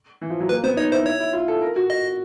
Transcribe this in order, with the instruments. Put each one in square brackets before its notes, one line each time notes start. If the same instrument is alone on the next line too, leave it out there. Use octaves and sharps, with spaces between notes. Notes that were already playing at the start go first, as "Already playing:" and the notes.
[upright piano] E3
F3
F#3
[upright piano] A#3 [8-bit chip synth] B4
[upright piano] B3 [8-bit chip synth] C5
[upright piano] D#4 [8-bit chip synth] C#5
[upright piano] E4 [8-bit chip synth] C5
[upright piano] E4 [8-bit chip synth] C#5
[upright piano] E4
F4
A4
A#4
F#4
[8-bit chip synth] D#5